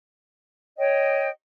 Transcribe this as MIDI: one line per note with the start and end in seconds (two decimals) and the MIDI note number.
0.78 1.29 73
0.78 1.29 75
0.78 1.29 79